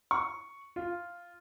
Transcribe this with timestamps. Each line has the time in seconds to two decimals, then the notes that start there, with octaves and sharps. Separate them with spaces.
0.11 C#6
0.76 F4